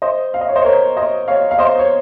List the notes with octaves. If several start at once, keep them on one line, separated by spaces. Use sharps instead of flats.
C5 D#5
F5
D#5
C#5
C5 D#5
A#4 C#5
C5 D#5
C#5 F5
F5
C5 D#5
C#5